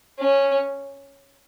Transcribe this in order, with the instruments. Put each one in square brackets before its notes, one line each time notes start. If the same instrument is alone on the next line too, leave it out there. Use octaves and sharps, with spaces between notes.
[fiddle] C#4